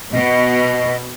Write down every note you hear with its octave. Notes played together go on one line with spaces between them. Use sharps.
B2 D#5